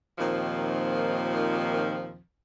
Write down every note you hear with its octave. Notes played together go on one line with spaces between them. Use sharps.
D#2 A#2 D#3 F3 C4